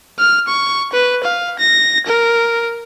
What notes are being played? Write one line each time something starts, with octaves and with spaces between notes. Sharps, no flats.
F6
C#6
B4
F5
A#6
A#4